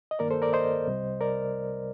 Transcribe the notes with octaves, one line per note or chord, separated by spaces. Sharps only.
D#5
G2 D#3 A#3 A#4 D5
A4 C5
A#4 D5
C5 D#5
C2 C3 G3
A#4 D5